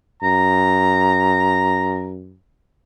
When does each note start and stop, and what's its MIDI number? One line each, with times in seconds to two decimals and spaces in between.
0.22 2.37 42
0.22 2.08 82